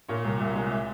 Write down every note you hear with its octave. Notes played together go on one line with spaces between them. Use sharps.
A#2 C#5
C2
C2 E5
G#3
E5